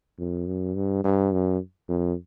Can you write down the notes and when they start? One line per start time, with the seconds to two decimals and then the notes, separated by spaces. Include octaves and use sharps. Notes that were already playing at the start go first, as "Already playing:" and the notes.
0.19 F2
0.47 F#2
0.76 G2
1.04 G2
1.33 F#2
1.89 F2